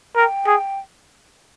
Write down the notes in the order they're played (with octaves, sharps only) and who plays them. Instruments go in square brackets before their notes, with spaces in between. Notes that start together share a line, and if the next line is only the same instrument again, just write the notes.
[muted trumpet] A#4 [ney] G5
[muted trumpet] G#4